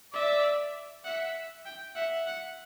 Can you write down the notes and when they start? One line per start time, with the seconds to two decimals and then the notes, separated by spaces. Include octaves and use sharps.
0.13 D5 E5
1.05 E5 F#5
1.65 G5
1.95 E5 F#5
2.27 F#5